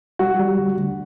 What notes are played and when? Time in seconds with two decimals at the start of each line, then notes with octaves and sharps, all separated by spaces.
0.19 G3 F#4
0.39 G3
0.59 D2
0.78 D2